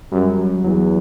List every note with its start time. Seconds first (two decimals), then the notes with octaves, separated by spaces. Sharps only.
0.12 F#2 G3
0.27 G3
0.38 F#3
0.64 E2 F#3